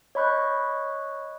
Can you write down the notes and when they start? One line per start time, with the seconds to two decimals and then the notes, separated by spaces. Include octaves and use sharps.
0.15 C#5 D#5 B5 C#6 F#6 G6